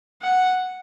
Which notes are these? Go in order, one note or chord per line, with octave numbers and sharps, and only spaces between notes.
F#5